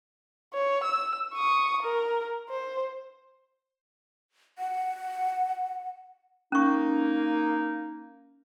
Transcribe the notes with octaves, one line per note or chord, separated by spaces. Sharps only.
C#5
E6
C#6 D#6
A#4
C5
F#5
A#3 C#4 D#4 C#6